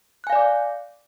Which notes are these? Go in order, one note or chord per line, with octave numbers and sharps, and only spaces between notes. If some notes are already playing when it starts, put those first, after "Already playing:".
D5 F5 G#5 D6 F#6